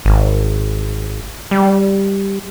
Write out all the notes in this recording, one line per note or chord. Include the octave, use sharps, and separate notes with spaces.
G#1
G3